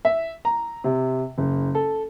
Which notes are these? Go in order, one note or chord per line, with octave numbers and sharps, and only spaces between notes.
E5
A#5
C3
F#1
A4